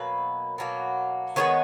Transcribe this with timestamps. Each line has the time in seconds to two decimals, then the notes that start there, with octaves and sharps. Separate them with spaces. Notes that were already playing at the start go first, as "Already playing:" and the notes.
Already playing: B2 F#3 A#3 B4
0.58 B2 F#3 A#3
1.36 D#3 G#3 B3 C#5